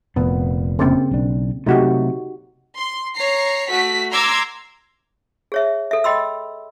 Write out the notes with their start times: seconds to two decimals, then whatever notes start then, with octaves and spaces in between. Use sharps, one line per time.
0.16 F1 A#2 B3
0.79 C#3 A#3 C4
1.11 B1 D4
1.67 C3 F#3 A3 D#4 F#4 G4
2.77 C6
3.15 C#5 A#5 C7
3.70 A3 F#4 B6
4.11 A#5 C6 D6 E6 G#6 C7
5.52 G#4 C#5 E5
5.91 A4 E5
6.04 D#5 G5 B5 C6 E6